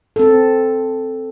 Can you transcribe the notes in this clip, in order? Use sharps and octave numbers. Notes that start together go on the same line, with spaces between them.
C4 A4